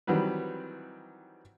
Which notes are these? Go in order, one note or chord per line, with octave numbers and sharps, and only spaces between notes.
D#3 E3 F#3 G3 C4 B4